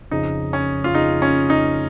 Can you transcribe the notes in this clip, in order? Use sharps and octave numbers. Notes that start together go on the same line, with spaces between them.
F2 C#3 F3 D#4
C#4
F4
F2 C#3 F3 D#4
C#4
D#4